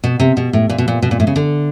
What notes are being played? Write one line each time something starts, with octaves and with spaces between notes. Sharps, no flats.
B2
C3
B2
A2
A#2
B2
A#2
B2
A#2
A2
C#3
D3